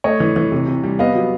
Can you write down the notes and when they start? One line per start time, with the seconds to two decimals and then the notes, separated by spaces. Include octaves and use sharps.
0.04 A3 C#5 D#5
0.20 E3
0.36 E3
0.52 C3
0.68 C3
0.84 G3
0.99 B3 D#5 F5
1.15 F#3